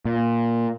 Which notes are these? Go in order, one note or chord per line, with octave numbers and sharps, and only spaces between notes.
A#2